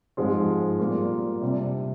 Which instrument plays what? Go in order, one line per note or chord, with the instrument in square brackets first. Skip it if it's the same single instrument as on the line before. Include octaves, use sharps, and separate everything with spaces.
[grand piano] G#2 F3 G#3 C4 F4
A#2 G3 A#3 F4
C3 G3 D4